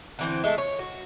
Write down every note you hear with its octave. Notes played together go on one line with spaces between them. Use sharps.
D3 E3 C4
G#3 A3 F#4 A4
C#5
F#4